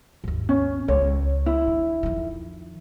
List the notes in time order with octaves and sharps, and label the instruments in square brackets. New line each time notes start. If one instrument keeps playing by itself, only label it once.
[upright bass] G#1 D#2
[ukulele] C#4
[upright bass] C#2 [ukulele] C#5
[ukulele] E4
[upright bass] D3
F2 D#3